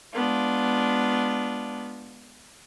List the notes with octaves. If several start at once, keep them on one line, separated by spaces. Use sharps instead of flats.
G#3 B3 D4 F4